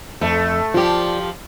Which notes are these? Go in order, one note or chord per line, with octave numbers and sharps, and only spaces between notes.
F2 A3
F3 F4 G4 D5